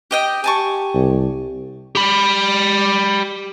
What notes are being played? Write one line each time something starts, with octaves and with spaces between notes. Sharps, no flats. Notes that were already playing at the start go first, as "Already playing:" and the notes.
G4 D#5 G5
G4 G#5 A5 C#6
C2
G4 B5